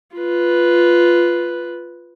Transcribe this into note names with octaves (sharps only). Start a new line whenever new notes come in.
F4 B4